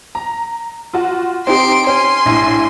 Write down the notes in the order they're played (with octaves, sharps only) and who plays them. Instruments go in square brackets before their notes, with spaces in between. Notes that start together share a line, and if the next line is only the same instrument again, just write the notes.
[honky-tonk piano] A#5
F4 F#4
[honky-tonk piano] C4 D#4 G4 [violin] C6 D7
[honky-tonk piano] C#4 [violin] G#5 C6
[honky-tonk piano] A#1 A2